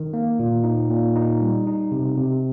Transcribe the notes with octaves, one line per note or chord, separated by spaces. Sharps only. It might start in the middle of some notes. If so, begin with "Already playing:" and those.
Already playing: D#3
A#3
A#2
D#4
A#2
D#4
G3
D#4
C3
C3